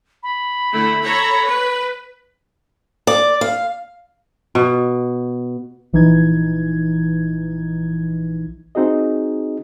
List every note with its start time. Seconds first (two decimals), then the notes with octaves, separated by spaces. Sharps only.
0.23 B5
0.72 D3 A3 E4
1.03 A4 C#5 A#5
1.46 B4
3.07 D5
3.41 F5
4.55 B2
5.93 A#1 E3 D#4 G#6
8.75 C4 D#4 F#4 G#4 D#5